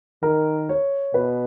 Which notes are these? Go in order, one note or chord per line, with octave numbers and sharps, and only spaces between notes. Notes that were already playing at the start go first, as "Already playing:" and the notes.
D#3 A#4
C#5
B2 B4